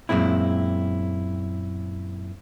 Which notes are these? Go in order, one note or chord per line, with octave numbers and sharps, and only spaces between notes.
F#2 A#2 G#3 C4 E4